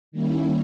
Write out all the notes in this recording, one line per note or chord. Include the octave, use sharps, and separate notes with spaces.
D#3 G3 A#3 C#4 E4